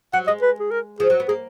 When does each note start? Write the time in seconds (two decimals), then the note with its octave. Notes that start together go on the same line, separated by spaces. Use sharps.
0.13 F#3 F#5
0.27 G#3 D#5
0.42 B4
0.60 G#4
0.71 A#4
1.00 F3 G#4
1.10 F#3
1.20 B3
1.28 A#3 G#4